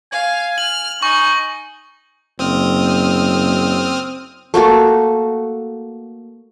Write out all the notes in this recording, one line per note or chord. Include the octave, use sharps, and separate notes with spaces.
F5 G#5
F6 F#7
D#4 G#5 C#6
F#1 C4 D#6 F6
A3 A#3 F#4 A4